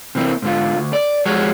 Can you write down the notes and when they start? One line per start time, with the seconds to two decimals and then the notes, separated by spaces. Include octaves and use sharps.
0.15 C3 E3 A#3 C4
0.42 G#2 D3 F4
0.77 D2
0.93 D5
1.25 F3 G3 G#3 F#4 G#4 C#5